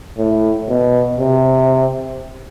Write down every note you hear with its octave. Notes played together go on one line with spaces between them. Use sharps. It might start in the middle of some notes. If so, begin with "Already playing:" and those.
A2
B2
C3